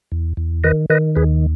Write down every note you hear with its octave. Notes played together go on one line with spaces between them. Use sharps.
E2
E2
D#3 B4 D#5
D#3 B4 D#5
D#2 G#4 B4